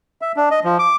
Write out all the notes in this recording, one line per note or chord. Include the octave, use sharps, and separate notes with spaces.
E5
D4
D#5
F3
D6